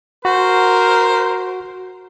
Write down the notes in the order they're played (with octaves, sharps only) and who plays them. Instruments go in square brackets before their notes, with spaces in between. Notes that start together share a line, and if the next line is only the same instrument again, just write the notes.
[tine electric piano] F#4 [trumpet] A#4 [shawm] C5